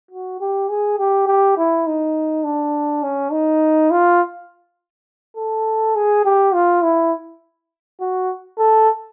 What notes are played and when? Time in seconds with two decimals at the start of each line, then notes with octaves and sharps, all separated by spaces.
0.11 F#4
0.41 G4
0.69 G#4
0.99 G4
1.27 G4
1.57 E4
1.87 D#4
2.44 D4
3.03 C#4
3.32 D#4
3.91 F4
5.37 A4
5.95 G#4
6.25 G4
6.53 F4
6.83 E4
8.00 F#4
8.58 A4